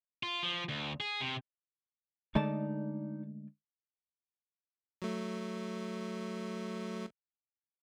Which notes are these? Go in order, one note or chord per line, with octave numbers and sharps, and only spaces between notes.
F4
F3
D2
G#4
C3
D3 G#3 A3 D#4 D5 A5
F#3 A3